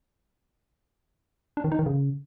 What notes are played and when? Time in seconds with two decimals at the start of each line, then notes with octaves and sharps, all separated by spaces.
1.57 D4
1.64 D#3
1.72 D#4
1.79 D#3
1.86 C#3